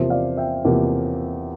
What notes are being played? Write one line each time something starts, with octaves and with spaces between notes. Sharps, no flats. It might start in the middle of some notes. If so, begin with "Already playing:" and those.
Already playing: E2 C3 F3 A#3 C5 E5
D5 F5
E5 G5
E2 C3 F3 A#3